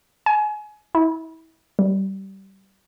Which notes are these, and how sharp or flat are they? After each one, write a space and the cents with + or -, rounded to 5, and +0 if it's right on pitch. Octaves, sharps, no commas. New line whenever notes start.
G#5 +30
E4 -30
G3 -20